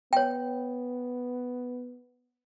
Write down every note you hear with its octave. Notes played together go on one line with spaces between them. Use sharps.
B3 C#5 G5